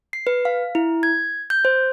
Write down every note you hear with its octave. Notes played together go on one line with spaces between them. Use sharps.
C7
B4
F5
E4
G#6
G6
C5